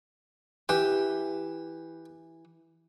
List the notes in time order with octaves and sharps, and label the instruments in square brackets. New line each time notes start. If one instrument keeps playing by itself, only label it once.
[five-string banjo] E3 [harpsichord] G4